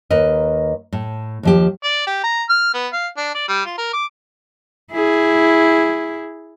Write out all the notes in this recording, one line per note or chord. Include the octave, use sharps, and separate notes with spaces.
D#2 A#4 B4 D#5
A2
D#2 F3 G4
D5
G4
A#5
F6
B3
F5
D4
D5
G3
F4
A#4
D6
E4 G#4